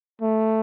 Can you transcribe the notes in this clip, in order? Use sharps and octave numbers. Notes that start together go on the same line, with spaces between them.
A3